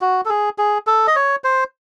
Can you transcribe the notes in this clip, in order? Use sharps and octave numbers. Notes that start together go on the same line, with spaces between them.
F#4
A4
G#4
G#4
A4
D#5
C#5
C5